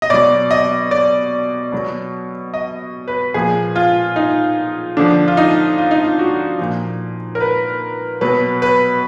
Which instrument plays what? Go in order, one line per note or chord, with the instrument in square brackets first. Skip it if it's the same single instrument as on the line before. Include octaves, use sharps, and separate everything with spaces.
[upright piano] D#5
B2 F#3 D5
D#5
D5
B2 F#3
D#5
B4
A#2 F3 G#4
F4
D#4
D3 F3 D4
F4
D#4
F4
D#4
F4
F#4
A#2 F3
A#4
B4
B2 F#3 B4
B4